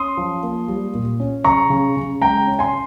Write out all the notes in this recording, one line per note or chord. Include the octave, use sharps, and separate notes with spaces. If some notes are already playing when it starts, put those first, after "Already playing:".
Already playing: C#4 C6 D#6
F3
A#3
G3
A#2
C#4
C#3 A#5 C#6
C#3
C#3
G#3 G5 A#5
C#4
G#5 C6